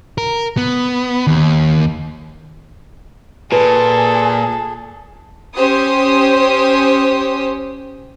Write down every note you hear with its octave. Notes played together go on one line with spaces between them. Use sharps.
A#4
B3
D#2
A#2 G#4 A4 B4
C#4 G4 C5 D#6